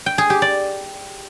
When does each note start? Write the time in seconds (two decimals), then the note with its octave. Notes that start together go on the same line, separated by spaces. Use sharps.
0.06 G5
0.18 G#4
0.30 G4
0.42 D5